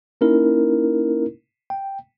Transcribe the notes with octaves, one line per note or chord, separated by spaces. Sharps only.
A#3 C#4 D#4 E4 A#4
G5